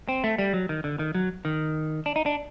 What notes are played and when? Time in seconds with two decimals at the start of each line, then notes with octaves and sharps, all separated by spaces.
0.09 C4
0.24 A3
0.38 G3
0.53 F#3
0.69 D#3
0.84 D3
0.99 D#3
1.15 F#3
1.45 D#3
2.06 D4
2.16 D#4
2.26 D4